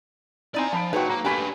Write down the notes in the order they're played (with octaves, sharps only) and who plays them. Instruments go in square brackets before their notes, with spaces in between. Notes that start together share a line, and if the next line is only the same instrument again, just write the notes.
[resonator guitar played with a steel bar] C4 D#4 E4 [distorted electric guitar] D5 G#5
[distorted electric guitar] F3 [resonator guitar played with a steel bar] F5 [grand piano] A5 B5 D7
[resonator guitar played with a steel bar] A#2 F#3 F#4 [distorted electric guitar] D#4 [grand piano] B4 G5
[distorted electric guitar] A#3 [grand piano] A#5
[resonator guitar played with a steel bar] A3 A#3 G4 [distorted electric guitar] D4 B4 [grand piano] G#5 B5 B6